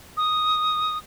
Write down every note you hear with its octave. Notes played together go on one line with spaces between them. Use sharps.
D#6